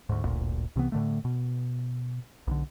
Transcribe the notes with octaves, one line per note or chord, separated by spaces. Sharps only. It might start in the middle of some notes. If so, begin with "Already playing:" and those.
D2 G#2
D1 G1 D2 A#2
C2 C3 E3 B3
A2 D3 A3
B2
B1 D3